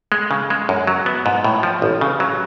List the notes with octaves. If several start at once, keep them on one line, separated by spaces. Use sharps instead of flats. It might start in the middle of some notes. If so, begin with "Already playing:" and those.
G#3
C#3
G#3
F#2
F#3
B3
G#2
A2
F3
A1
C#3
F#3